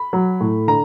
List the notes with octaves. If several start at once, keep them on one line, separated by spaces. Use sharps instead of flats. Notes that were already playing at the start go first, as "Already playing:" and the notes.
Already playing: B5
F#3
A2
D3 A#5